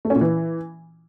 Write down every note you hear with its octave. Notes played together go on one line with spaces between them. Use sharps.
A3
C#4
A#2
E3